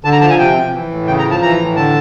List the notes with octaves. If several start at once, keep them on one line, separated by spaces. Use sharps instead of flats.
D3 A5
A#5
F3 A5
G#5
C3 G5
F3
E3
A2
C#3 G5
A#5
F3
A5
E3 A#5
A2
D3 A5